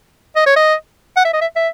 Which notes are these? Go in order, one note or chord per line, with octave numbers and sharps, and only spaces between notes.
D#5
C#5
D#5
F#5
E5
D#5
E5
E5